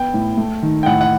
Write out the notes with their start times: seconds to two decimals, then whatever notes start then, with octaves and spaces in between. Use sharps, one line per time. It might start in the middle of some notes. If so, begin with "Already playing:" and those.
Already playing: B3 G5
0.14 A2
0.37 A3
0.63 D#3
0.83 G5
0.86 A2 F#5
1.01 F#5